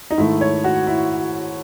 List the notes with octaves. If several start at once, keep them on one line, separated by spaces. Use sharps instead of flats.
D#4
G#2 D#3 A3 E4
C#5
F#4
E4